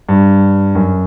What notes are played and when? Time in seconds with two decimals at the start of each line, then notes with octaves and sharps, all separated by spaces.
0.09 G2
0.75 F#2